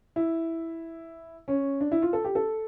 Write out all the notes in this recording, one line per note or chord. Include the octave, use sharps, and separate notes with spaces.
E4
C#4
D4
E4
F4
A4
G4
A4